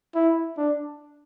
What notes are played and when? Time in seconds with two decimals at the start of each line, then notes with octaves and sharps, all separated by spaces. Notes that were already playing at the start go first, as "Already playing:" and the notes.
0.15 E4
0.57 D4